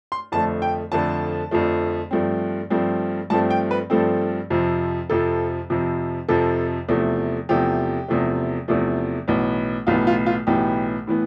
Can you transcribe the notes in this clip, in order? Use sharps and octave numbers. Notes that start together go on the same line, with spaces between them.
C6
F2 D3 F3 A3 A5
G5
F2 D3 F3 A3 A5
F2 D3 F3 A3
G2 F3 A3 C4
G2 F3 A3 C4
G2 F3 A3 C4 A5
G5
B4
G2 F3 A3 C4 A4
F2 C3 F3
F2 C3 F3 A4
F2 C3 F3
F2 C3 F3 A4
E2 C3 F3 A3
E2 C3 F3 A3 G4
E2 C3 F3 A3
E2 C3 F3 A3
B1 A2 E3 B3
B1 A2 E3 B3 F4
F4
F4
B1 A2 E3 B3 G4
A2 E3 B3